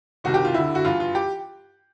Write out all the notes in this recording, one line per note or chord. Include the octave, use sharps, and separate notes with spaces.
C2 C3 D#3 F#4
G4
F4
D2 D3 E4
F#4
G2 E3 F4
F4
G4